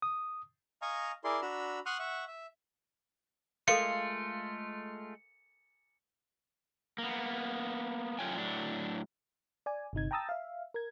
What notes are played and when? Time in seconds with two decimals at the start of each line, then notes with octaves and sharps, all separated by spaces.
0.02 D#6
0.82 D#5 F5 G#5 A#5 C#6 D#6
1.24 E4 G#4 A#4 D5 C6
1.42 D4 F#4 A#5 B5 E6
1.86 F#5 C6 C#6 D#6 F6 F#6
1.99 E5 F#5 C#6
2.27 E5
3.68 G#3 A3 F4 A4 A#4 F5 C#7
6.98 A#3 B3
8.19 F#2 A3 F4 C#5 G5 G#5
8.36 A2 F#3 D4
9.66 D5 G#5
9.93 G1 C3 D#4 G#6
10.11 G5 A5 A#5 D#6 E6 A6
10.29 E5 F5
10.74 A#4 G#6